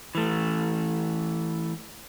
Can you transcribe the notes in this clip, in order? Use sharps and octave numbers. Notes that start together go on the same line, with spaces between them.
E3 A3